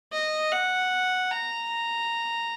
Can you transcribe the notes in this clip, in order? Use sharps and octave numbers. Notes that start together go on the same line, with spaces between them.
D#5
F#5
A#5